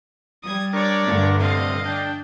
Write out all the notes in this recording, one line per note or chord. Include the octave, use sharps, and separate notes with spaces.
G3 D#6 G#6
D4 A#4 C#5 D5
G2 D3 A3
C3 D#5 F5
D4 G5